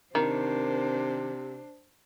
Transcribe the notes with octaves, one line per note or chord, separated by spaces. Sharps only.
C3 D#3 D4 C5